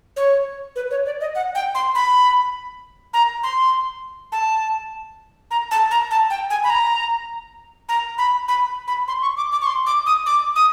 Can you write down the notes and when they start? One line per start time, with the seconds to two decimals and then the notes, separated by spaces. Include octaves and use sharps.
0.16 C#5
0.76 B4
0.91 C#5
1.06 D5
1.21 D#5
1.35 F#5
1.55 G5
1.75 C6
1.95 B5
3.14 A#5
3.43 C6
4.32 A5
5.51 A#5
5.71 A5
5.91 A#5
6.11 A5
6.30 G5
6.50 G#5
6.64 B5
6.70 A#5
7.89 A#5
8.18 B5
8.48 B5
8.88 B5
9.08 C6
9.22 C#6
9.37 D6
9.52 D6
9.61 C#6
9.67 C6
9.86 D6
10.06 D#6
10.26 D6
10.56 D#6